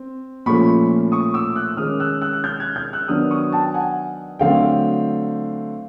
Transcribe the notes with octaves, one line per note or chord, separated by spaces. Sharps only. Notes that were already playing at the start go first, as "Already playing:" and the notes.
Already playing: C4
A#2 F3 A3 C#4 B5 C#6
C#6 D#6
D6 E6
E6 F#6
D#3 G#3 C#4 D#6 F6
E6 F#6
E6 F#6
F#6
F6 G6
F#6 G#6
F6 G6
E6 F#6
D#3 F#3 B3 D4 D#6 F6
C#6 D#6
G5 A5
F#5 G#5
D3 F#3 A3 C4 F5 G5